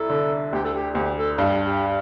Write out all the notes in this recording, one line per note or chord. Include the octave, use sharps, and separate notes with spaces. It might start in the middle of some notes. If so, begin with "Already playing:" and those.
Already playing: C2 E4 A4
D3
D2 G4
A4
G4
D2 G4
A4
G2 G4
G4